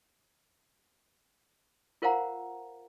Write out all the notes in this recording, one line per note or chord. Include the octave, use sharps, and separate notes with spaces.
F4 A#4 C5 F5 F#5 A#5